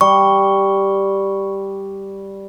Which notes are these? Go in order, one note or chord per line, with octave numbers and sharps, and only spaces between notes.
G3 C#6